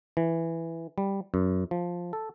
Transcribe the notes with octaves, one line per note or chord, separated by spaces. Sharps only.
E3
G3
F#2
F3
A4